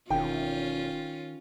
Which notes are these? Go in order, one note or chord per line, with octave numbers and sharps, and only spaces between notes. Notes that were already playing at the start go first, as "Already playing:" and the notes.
E1 D#3 C#4 F4 G5